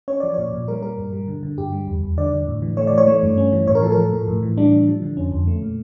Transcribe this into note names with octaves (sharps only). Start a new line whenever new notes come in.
C#4 C#5
F3 D5
A#2 C#5
A#2
G3 A#4
G3 A#4
G2
G3
D3
D3
G2 G4
G3
E2
E2
D3 D5
D3
A2
E3
A3 C#5
D5
E3
C#5
A3
G2
C#4
E3
A2 C#5
A#4
F3 A4
A#4
F3
A2
A2
E3
G3 D4
A2
F3
D3
F2 C#4
F2
A3
A#2